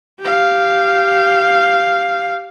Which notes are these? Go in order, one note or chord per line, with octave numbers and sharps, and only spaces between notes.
G4 F5